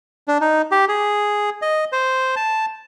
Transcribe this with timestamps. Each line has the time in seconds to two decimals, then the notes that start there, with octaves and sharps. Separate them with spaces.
0.28 D4
0.41 D#4
0.72 G4
0.88 G#4
1.62 D#5
1.92 C5
2.36 A5